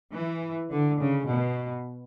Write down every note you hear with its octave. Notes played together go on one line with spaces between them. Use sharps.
E3
D3
C#3
B2